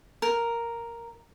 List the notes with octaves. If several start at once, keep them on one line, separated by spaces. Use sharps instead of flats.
A#4